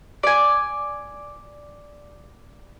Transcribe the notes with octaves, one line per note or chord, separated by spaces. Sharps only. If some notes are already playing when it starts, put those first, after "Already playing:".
D5 G#5